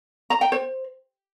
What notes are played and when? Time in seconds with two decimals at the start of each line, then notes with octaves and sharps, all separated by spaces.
0.30 A#5
0.41 G5
0.52 C5